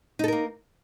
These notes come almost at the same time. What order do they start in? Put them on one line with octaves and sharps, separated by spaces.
D#4 A4 A#4 A#3